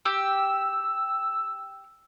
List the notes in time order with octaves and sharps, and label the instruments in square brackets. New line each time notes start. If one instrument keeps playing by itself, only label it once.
[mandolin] G4 [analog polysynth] E6